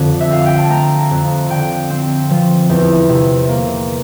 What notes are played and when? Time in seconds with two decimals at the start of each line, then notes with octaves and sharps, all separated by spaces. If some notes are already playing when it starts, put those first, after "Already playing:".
Already playing: F2 D3
0.20 E5
0.30 C4 F5
0.46 G5
0.58 A5
0.70 A3 A#5
1.11 F2
1.49 D3 G5
1.90 C4
2.30 F3
2.69 E2
3.09 C3
3.49 A#3